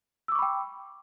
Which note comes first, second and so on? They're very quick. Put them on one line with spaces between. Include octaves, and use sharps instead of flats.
E6 D6 C#6 B5 G5